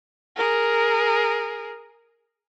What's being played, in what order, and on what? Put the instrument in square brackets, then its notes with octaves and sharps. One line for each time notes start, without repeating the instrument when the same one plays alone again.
[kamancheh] G#4 A#4